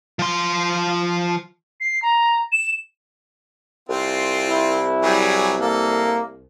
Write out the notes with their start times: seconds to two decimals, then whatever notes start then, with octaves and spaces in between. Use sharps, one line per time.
0.19 F3 C6
1.80 C7
2.02 A#5
2.52 E7
3.89 C2 C4 F4
4.49 E4
5.03 F#3 G3 G#4
5.61 A#3 A4